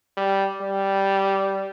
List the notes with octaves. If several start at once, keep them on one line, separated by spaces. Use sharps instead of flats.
G3
G3